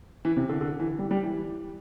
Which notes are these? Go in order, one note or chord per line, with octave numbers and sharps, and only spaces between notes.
E3
C3
D3
D3
E3
G3
G3
E3